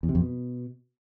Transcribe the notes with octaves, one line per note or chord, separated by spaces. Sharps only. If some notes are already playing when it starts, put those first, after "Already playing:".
E2
C3
F2
B2